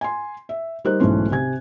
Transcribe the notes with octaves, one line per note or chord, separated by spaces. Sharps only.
G#5 C6
E5
G3 D#4 A#4 C5 F#6
B1 G#2 E3 A3 C#4 C6
C3 G#5 G#6